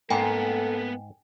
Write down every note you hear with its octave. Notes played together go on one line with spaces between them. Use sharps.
G#2 A#3 B3 A4 G5 G#5